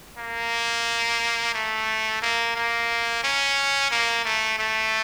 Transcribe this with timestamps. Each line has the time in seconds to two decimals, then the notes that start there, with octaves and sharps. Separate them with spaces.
0.18 A#3
1.54 A3
2.22 A#3
2.56 A#3
3.24 C#4
3.91 A#3
4.25 A3
4.59 A3